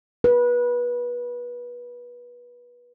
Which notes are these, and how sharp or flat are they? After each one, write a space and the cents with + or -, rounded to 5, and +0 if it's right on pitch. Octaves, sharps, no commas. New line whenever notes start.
B4 -25